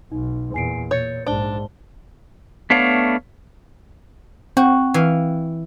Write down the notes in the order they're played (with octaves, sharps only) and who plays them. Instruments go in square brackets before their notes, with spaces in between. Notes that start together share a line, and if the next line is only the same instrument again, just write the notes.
[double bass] B1 [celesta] D#4
[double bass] E2 A#2 [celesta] G#5 C7 D7
[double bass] A#2 [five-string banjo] C#5 [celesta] G6 A6 C#7
[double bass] A#1 G#2 [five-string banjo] D4 [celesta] C5 A5 G7
[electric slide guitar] A3 B3 D4 C#5 F5
[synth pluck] C4 G5 [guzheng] F#4
[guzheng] E3 F5